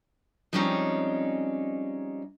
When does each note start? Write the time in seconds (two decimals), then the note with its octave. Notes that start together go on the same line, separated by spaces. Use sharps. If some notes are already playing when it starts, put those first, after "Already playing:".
0.53 F3 G3 G#3 C4 C#4 D#4